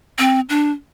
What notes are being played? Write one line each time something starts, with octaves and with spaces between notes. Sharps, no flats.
C4
D4